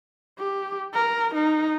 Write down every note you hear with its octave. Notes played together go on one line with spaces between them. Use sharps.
G4
A#4
D#4